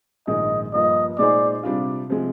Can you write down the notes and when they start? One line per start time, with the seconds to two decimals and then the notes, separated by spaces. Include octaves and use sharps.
0.27 A#1 G#2 D#3 G#3 D#5
0.74 G2 F3 A#3 D#5
1.18 A#2 G#3 D#4 G#4 C5 D5
1.63 C3 G3 D4 F4
2.10 C3 F3 G#3